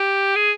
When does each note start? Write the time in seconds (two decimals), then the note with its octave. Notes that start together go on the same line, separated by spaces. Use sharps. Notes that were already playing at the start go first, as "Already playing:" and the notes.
Already playing: G4
0.36 G#4